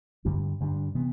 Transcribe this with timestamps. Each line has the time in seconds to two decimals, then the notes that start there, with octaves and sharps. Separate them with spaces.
0.25 G2 D3 G3 D4
0.60 G2 D3 G3 D4
0.95 C3 E3 B3